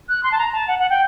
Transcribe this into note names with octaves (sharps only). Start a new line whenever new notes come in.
F#6
C6
A5
A#5
A5
F#5
F#5
G5